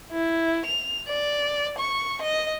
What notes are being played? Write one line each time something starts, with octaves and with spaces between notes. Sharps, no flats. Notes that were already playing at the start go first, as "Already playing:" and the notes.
E4
F7
D5
C#6
D#5